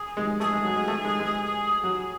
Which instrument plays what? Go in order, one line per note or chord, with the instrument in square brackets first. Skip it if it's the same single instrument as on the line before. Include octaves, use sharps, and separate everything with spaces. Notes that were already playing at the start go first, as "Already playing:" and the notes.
Already playing: [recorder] G#4
[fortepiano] G#3
[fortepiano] A3 [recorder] G#4
[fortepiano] G#3
F#3
G#3
A3
G#3
G#3
F#3